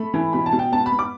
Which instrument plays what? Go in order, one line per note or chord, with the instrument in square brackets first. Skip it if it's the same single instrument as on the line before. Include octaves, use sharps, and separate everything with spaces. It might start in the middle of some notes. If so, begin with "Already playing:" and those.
Already playing: [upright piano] A3 B5
E3
B2 B5
A5
B2
G5
B3 A5
B5
B3
D6